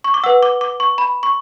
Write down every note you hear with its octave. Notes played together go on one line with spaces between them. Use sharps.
C#6
D6
B4 F#5 E6
D6
D6
C#6
B5
C#6